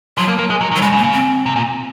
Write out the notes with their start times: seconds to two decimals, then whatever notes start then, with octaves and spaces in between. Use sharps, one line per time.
0.18 F3 F#3
0.28 A#3
0.39 A#3
0.50 G#3
0.61 F#3
0.72 D#3
0.76 F#3
0.82 C#3 G#3
0.92 C#3
0.98 A#3
1.03 C#3
1.14 C4
1.46 C3
1.56 A#2